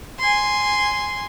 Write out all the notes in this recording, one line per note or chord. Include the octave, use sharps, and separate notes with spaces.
G#5 C6